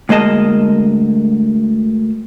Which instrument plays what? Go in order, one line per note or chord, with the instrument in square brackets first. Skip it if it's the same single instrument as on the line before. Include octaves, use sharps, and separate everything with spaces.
[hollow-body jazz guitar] D2 G#3 A#3 D#5 A5